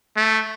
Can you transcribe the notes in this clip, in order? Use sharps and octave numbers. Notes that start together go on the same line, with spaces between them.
A3